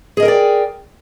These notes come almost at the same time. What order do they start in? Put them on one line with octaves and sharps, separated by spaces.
G#4 D#5 A#4 G5 D5